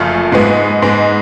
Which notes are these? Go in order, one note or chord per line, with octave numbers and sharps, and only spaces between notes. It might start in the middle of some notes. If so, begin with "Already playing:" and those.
Already playing: F#1 F#2 F3 A3 F4
G#2 G#3 B3
G#2 G#3 B3